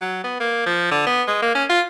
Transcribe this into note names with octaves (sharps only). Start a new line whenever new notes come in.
F#3
B3
A#3
F3
D3
B3
G#3
A#3
C#4
F4